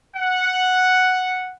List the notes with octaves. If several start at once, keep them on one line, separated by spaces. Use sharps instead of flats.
F#5